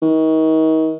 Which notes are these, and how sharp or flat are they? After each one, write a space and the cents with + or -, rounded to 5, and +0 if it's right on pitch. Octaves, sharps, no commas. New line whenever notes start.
D#3 +35